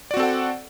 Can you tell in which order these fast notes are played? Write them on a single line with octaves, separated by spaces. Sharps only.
D5 F#4 C4 A4 F#5